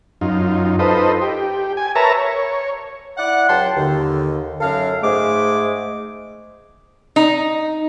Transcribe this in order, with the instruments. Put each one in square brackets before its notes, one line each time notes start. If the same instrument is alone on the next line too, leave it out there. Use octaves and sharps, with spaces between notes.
[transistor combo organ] F#2 D#4 F4
D#4 F4 A4 B4 C5 D#5
G4
G#5
A#4 B4 C#5 E5 A5 A#5
C#5
[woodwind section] E4 D5 F#5
C#2 F#3 G5 A5 C6
D#2 D3
F#2 A4 A#4 F5
G#2 G#3 A3 G#4 D6
[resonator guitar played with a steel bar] D#4